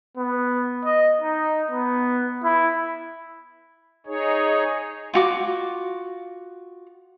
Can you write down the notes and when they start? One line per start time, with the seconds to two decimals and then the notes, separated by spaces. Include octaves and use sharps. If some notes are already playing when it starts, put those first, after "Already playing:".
0.17 B3
0.85 D#5
1.22 D#4
1.71 B3
2.44 E4
4.06 D#4 G#4 C#5
5.14 F4 F#4 D6